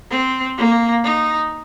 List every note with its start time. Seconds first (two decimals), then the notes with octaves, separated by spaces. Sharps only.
0.11 C4
0.58 A#3
1.04 D#4